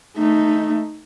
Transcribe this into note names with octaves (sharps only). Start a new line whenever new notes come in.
A3 D#4